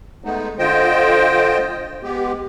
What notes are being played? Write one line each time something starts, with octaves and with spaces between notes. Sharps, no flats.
G#3 A3 B3 D#4
D3 F4 C5 D#5 G5
G#3 B3 G4